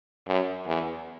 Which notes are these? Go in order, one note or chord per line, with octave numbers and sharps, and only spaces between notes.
F#2
E2